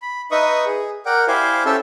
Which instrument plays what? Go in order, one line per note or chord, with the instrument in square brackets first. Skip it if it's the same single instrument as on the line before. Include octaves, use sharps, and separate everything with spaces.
[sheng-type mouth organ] B5
D#4 B4 D#5 E5 C#6 D#6
G#4
A#4 D5 F#5 G5
E4 G4 C5 D5 F5 G#5
C#4 G4 A4 E5 A5